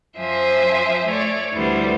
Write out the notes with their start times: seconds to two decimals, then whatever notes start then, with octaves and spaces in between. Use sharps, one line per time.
0.18 F#2 F3 C5 E5 G#5
1.07 A3 C#5 D5
1.54 D2 E3 G3 B3 C5